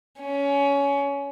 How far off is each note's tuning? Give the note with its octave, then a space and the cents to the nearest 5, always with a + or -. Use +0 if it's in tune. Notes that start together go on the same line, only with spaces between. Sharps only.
C#4 +20